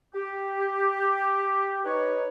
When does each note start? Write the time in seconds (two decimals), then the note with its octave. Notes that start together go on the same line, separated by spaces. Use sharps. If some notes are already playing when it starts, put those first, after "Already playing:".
0.15 G4
1.85 D#4 B4 C#5